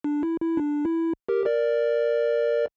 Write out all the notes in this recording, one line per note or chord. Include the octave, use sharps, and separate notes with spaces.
D4
E4
E4
D4
E4
G4 A#4
A#4 D5